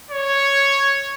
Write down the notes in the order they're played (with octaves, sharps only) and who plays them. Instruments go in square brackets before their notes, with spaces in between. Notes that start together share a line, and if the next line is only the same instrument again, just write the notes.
[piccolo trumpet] C#5